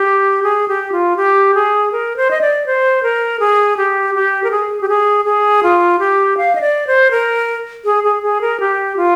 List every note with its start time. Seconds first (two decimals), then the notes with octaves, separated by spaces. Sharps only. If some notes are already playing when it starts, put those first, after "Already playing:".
Already playing: G4
0.43 G#4
0.68 G4
0.92 F4
1.17 G4
1.55 G#4
1.92 A#4
2.17 C5
2.31 D#5
2.41 D5
2.66 C5
3.03 A#4
3.40 G#4
3.77 G4
4.15 G4
4.44 A#4
4.51 G#4
4.81 G4
4.89 G#4
5.25 G#4
5.63 F4
5.99 G4
6.37 F5
6.55 D#5
6.61 D5
6.87 C5
7.11 A#4
7.85 G#4
8.04 G#4
8.23 G#4
8.41 A#4
8.60 G4
8.97 F4